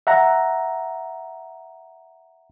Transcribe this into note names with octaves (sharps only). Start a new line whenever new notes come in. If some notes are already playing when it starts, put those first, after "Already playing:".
E5 F#5 A#5